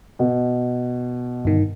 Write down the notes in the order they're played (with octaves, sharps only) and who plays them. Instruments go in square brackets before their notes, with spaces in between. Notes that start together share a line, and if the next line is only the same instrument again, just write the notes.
[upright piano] B2
[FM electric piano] G1 D#3